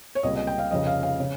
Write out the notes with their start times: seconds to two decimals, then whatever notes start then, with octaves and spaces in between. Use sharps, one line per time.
0.15 C#5
0.23 C#2 C3 G3 A#3 D#5
0.35 D#5
0.47 G5
0.58 F5
0.71 F1 F2 C#3 D#5
0.87 F5
1.03 F5
1.20 C#3